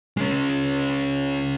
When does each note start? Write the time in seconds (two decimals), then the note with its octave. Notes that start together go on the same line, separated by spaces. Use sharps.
0.17 G#3 C#4